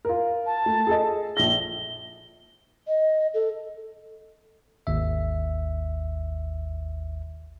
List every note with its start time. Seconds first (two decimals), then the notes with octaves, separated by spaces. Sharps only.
0.05 F4 A#4
0.46 A5
0.66 A3
0.87 G#4 A4 D#5
1.37 A#1 A#6 G7
2.87 D#5
3.34 A4
4.87 G#1 D#2 E5